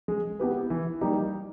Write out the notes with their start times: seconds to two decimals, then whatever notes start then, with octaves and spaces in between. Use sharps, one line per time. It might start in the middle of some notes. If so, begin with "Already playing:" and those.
0.08 G#3
0.39 B3 E4 G4 B4
0.70 E3
1.01 G3 A#3 D#4 G4